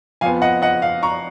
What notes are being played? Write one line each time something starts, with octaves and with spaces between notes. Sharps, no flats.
F2 F3 B3 F5 G#5
D#5 F#5
D#5 F#5
F5
A#5 C#6